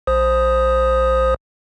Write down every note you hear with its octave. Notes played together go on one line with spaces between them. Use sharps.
A#1 C5 D#6